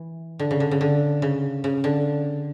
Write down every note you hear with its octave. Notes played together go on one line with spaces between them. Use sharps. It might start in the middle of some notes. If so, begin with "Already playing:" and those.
Already playing: E3
D3
C#3
D3
C#3
D3
C#3
C#3
D3